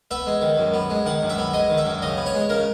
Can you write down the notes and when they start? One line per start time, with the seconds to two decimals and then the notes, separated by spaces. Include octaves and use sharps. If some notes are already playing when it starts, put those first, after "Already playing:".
0.11 B3 E5
0.27 G#3
0.42 D#3
0.58 F#2
0.74 B3
0.90 G#3
1.06 D#3 F#5
1.22 F#2
1.29 E5
1.38 B3
1.53 G#3 D#5
1.70 D#3
1.77 E5
1.86 F#2
2.02 C#3 D#5
2.17 B3
2.26 C#5
2.34 G#3
2.49 C#3 A#4